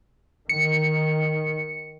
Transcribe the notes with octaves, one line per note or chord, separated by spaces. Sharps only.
D#3 C#7